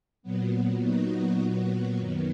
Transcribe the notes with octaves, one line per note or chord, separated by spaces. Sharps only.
A#2 F#3 B3
A#2 F#3 B3 D#4 F#4
A#2 F#3 B3 F#4
F#2 D#3 F#3 B3